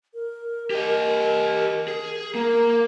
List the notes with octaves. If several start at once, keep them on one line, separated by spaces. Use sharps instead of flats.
A#4
G4 D#5
G#4
A#3 A#4